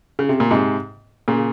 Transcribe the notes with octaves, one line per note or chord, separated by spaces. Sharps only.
C#3
C3
A#2
G#2 C3
A#2 C#3